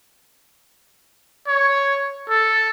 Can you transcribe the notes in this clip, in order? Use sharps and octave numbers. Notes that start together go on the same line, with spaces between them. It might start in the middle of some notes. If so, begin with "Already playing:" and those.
C#5
A4